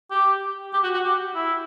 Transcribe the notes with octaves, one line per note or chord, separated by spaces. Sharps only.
G4
G4
F#4
F#4
G4
E4